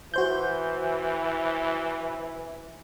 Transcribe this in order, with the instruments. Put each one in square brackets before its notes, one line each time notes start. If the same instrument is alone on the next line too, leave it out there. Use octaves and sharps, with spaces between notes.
[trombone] E3 [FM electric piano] F#4 C5 G6